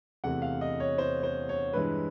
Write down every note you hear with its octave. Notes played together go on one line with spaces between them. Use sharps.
E2 C3 E3 A3 F#5
F5
D#5
C#5
C5
C5
C#5
G2 E3 G#3 B4